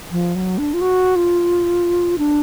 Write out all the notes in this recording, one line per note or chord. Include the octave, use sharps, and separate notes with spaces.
F3
F#3
D4
F4
F#4
F4
D4